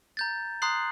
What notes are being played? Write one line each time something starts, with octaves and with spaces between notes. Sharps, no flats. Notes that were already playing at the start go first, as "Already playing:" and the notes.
A#5 G6 A6
A#5 C6 D#6 F#6 C7 F#7